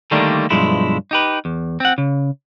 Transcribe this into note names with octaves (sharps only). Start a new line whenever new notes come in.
D3 D#3 G3 A3 A#3 D4
B1 G2 F3 G#3 E4
D#4 G4 B4
E2
C4 F#5
C#3